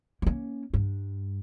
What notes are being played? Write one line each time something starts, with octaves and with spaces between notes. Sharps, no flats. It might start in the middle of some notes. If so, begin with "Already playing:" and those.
A#3 C#4
G2